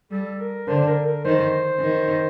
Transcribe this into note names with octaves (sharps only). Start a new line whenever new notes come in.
G3 A4
A#4
D3 C5
A#4
A#4
D#3 C5
D#3